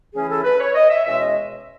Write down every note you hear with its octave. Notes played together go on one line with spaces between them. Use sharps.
C#3 E3 A3 C#4 E4 G#4
A4
B4
C#5
D#5
E5
E2 B2 G#3 C#4 E5
D#5